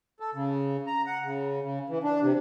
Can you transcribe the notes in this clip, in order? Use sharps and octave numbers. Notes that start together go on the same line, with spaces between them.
A4
C#3
A#5
F#5
C#3
C#3
E3
D4
C3